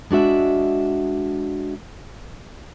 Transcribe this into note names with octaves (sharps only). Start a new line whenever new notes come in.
G#3 D4 F#4 E5